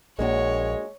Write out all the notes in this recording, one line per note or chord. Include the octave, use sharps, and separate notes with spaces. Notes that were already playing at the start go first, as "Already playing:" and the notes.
A#1 G#3 A#3 D4 F#4 C#5